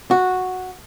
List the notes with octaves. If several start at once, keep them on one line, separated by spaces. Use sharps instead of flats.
F#4